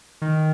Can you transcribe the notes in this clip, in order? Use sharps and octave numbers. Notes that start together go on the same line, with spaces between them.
D#3